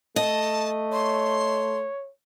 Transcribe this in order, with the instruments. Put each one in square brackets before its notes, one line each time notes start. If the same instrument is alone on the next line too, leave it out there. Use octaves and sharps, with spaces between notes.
[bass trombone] A3 [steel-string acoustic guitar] D#5 [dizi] A5
[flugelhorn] C#5 [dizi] C6